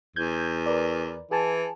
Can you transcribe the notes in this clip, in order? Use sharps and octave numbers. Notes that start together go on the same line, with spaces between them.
E2 G6 G#6
A#4 B4 D5
E3 G#4 G#5 A5